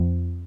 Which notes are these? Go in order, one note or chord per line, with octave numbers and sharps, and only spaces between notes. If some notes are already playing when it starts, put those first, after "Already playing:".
Already playing: F2